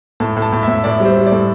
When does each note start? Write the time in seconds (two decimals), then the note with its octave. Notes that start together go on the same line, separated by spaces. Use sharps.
0.20 A2 A5
0.37 A2
0.42 A5
0.52 A2
0.63 E5
0.68 A2
0.84 A2 D5
1.00 G3
1.05 C5
1.16 G3
1.26 D5
1.32 A2